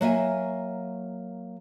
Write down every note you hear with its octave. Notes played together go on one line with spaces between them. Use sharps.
F#3 A#3 E5 G#5